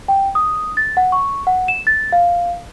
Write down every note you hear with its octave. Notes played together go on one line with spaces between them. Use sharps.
G5
D#6
A6
F#5
C#6
F#5
E7
A6
F5